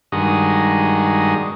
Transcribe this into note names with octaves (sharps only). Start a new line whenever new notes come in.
G2 D#3 G#3 F#4 D#6